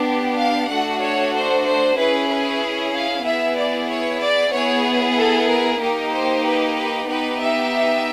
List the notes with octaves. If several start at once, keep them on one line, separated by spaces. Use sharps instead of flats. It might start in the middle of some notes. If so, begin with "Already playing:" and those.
Already playing: B3 D4 G4
F5
A3 D4 F#4 F#5
C#5
C5
C5
C#4 E4 G#4 B4
B4
F5
B3 E4 G#4 E5
D5
C#5
D5
B3 E4 G#4 C#5
A4
A#4
A#3 D#4 G4 A#4
C5
B4
B4
B3 D#4 G4 B4
E5